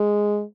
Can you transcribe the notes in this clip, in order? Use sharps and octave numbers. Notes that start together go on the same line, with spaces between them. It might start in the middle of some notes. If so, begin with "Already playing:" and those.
Already playing: G#3